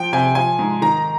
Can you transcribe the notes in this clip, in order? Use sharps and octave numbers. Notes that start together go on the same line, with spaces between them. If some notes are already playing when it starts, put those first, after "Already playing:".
Already playing: F3 G5
C3 G#5
F3 G#5
G#2
D#3 A#5